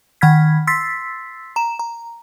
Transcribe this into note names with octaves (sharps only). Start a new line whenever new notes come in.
D#3 F#5 B5 F6 G#6 B6
C6 E6 A6 B6 C7
A#5 E7
A#5